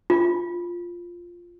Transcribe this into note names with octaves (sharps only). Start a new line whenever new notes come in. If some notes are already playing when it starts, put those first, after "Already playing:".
F4